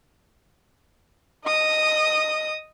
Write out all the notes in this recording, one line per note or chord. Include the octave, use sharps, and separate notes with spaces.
D#5 D#6